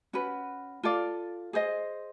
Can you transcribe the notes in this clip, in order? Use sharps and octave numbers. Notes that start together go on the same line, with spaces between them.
C#4 F#4 B4
F4 A4 D5 F5
G#4 C5 D#5